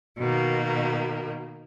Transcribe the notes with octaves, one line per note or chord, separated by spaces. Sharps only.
B2 D#3 A#3